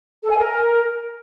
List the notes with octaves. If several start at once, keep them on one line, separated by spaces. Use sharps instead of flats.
A4
G#5
A#4